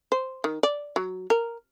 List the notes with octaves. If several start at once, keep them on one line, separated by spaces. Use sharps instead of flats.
C5
D#3
D5
F#3
A#4